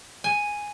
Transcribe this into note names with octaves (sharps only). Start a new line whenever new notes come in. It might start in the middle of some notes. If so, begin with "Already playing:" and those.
G#5